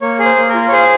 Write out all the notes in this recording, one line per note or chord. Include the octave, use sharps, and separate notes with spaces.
A#3 C#5
G#4
C5
A#3
A#4
F4
C#5
G#4 C5